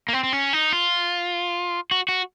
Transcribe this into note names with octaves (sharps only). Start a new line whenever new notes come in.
A#3
C4
C4
C#4
D#4
F4
F#4
F#4